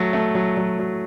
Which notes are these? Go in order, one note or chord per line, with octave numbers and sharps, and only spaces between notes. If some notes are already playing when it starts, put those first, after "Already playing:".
Already playing: F#3 A3
A3
F#3
F#3
F#3